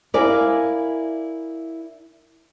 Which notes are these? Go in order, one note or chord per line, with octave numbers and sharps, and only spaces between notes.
E4 A#4 D5 F5 G#5